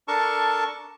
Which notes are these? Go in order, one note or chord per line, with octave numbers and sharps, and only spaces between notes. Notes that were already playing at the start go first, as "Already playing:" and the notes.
D4 A4 A#4 A5 C#6